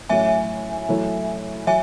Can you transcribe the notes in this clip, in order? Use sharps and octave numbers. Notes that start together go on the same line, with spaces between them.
A2 F#3 C#4 E5 G#5
F#3 A3 E4
F#3 E5 G#5